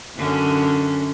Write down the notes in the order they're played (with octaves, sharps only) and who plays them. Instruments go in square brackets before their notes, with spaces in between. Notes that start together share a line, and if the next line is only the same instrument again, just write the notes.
[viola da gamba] F#2 D3 C#4